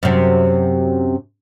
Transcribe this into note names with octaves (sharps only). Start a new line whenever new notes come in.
F#2 C3